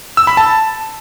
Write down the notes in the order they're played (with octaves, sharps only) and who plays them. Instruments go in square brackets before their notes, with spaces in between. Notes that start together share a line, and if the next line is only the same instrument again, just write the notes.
[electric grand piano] E6
B5
A5